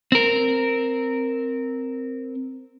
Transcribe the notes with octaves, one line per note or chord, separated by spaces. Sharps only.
C4 A#4